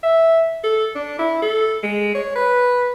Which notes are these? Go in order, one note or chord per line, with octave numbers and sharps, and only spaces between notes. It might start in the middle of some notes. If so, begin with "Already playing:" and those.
E5
A4
D4
E4
A4
G#3
C#5
B4